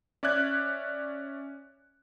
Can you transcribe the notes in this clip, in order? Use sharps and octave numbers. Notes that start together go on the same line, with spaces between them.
C#4 D5 E5 F#6 G#6